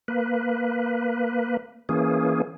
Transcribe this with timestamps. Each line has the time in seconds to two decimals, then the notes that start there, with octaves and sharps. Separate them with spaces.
0.08 A#3 B4
1.89 E3 A#3 C#4 G#4